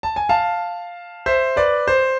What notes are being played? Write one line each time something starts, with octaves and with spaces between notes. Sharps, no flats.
A5
G#5
F5 A5
C5 E5
B4 D5
C5